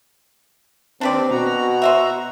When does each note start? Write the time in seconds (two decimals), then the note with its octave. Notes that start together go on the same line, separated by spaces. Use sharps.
1.01 D#2 C4 D4 B4 D5
1.31 B2 F#4 A#5
1.82 C5 D#5 E5